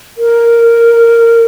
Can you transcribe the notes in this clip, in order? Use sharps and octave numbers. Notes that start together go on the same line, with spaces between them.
A#4